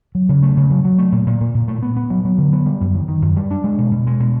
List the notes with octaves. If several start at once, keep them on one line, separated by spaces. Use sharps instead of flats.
F#3
C#3
A3
C#3
F#3
F#3
A3
A#2
A#2
A#2
A#2
A3
B3
B3
F#3
F#3
D3
B3
G3
F#2
D#3
D#3
F#2
G3
D4
G#3
B2
B2
G#3
B2